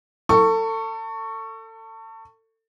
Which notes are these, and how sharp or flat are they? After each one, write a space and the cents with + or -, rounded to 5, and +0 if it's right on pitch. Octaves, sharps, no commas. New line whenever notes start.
A4 +30 C#6 +0